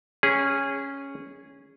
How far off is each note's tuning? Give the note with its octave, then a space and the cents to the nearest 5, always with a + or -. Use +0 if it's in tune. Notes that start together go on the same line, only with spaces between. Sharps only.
C#4 +0 G#4 -15